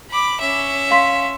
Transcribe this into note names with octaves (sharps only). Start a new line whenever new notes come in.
B5 D6
C#4 E5
F5 C6 B6